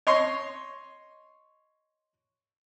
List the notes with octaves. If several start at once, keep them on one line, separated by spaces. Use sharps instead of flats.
C#5 D#5 C6 C#6